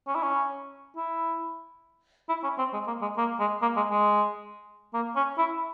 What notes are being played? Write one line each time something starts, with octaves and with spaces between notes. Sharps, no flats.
C#4
E4
C#4
E4
E4
C#4
C4
G#3
A#3
G#3
A#3
G#3
A#3
G#3
G#3
A#3
C#4
E4